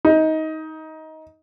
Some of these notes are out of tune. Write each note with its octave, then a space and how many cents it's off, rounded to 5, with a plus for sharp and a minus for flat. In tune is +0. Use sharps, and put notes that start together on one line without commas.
D#4 +20